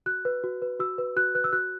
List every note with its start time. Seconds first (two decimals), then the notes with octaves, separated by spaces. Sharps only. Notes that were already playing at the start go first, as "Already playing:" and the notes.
0.06 F#4 F#6
0.25 B4
0.44 F#4
0.62 B4
0.80 F#4 E6
0.98 B4
1.16 F#4 F#6
1.35 B4 F#6
1.44 E6
1.53 F#4 F#6